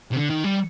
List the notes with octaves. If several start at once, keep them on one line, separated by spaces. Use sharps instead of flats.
C3
D3
D#3
G3